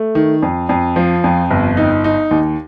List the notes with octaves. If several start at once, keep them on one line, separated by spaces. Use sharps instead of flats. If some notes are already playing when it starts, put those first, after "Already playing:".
Already playing: A3
D#3
F2
F2
F3
F2
G1
D#4
D#4
D#2